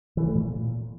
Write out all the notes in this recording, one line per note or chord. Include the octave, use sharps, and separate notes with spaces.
E3
A3
A#2